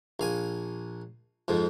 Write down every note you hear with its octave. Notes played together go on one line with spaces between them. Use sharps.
A#1 F5 G#5
F2 G#2 F3